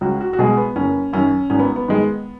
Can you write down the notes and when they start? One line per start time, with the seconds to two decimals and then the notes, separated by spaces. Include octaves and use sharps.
0.01 C#2 F#4
0.21 F#4
0.33 F#4
0.39 B2 G#3 G#4
0.57 B3
0.76 F#1 C#4
1.13 F#2 D#3 C#4
1.50 G#1 C#4
1.59 B3
1.76 B3
1.88 G#2 D#3 G#3